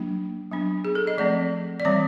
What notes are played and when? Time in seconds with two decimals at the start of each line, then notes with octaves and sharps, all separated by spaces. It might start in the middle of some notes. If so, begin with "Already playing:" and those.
Already playing: F#3 A#3 D4
0.51 F#3 B3 D4
0.85 G#4
0.95 A4
1.07 D#5
1.18 F3 A3 C4 D5
1.80 D5
1.85 E3 G3 C4 C#5